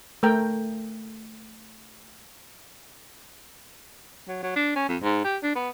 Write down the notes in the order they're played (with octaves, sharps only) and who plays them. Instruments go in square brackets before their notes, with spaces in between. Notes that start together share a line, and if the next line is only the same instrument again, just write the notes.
[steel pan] A3 A#4 G5
[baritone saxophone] F#3
F#3
D4
C#4
F2
G#2
G4
D4
B3